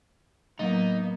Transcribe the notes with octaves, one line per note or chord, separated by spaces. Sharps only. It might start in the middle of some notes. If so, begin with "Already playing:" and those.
A2 F#3 A#3 B3 D#4